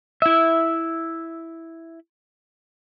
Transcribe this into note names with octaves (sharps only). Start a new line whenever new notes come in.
E4 E5